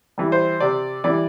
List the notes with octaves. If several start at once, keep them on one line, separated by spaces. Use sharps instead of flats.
E3 G3
C5
C3 D5
E3 G3 D5